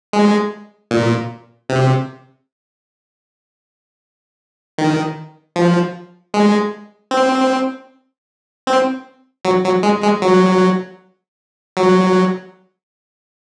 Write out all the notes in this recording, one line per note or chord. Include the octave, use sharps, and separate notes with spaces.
G#3
A#2
C3
D#3
F3
G#3
C4
C4
F#3
F#3
G#3
G#3
F#3
F#3